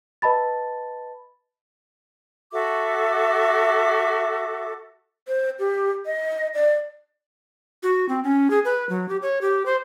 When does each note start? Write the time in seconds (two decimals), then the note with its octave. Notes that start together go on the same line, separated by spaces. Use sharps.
0.22 B4 D#5 A5 B5 A6
2.52 F#4 A4 E5 D6
5.28 C5
5.59 G4
6.06 D#5
6.54 D5
7.83 F#4
8.09 C4
8.24 C#4
8.50 G#4
8.65 B4
8.89 F#3
9.09 G4
9.22 C#5
9.41 G4
9.66 C5